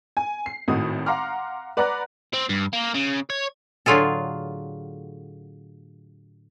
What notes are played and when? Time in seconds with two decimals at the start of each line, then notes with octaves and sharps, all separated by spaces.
0.17 G#5
0.46 C7
0.68 G#1 A2 D#3 F#4 D#6
1.06 F5 F#5 A#5 C6 D6 F6
1.77 B4 D5 F#5 A#5 D6 F#6
2.33 C4
2.49 G2
2.73 A#3
2.94 C#3
3.30 C#5
3.86 A2 D3 F#3 F4 G#4 A4